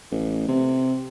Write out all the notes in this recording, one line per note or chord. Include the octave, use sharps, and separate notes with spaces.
A1
C3